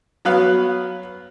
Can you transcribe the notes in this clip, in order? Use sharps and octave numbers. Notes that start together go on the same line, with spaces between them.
F#3 B3 B4 F5